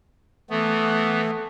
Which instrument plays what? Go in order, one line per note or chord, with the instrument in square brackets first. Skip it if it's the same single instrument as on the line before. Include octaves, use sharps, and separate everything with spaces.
[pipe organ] E3 B3 [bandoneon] A3